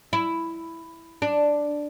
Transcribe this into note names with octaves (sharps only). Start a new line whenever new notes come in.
E4
D4